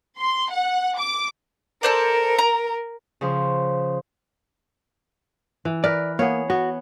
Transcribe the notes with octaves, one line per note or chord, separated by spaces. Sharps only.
C6
F#5
D6
A4 A#4 C5 D5
A#5
C#3 F3
E3
A#4 B4 D5
A#3 B3 G#4 C#5
B3 F#4